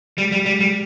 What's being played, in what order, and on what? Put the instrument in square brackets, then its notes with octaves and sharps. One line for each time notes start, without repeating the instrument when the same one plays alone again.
[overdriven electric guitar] G3 [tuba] G#3
[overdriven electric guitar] G3
G3
G3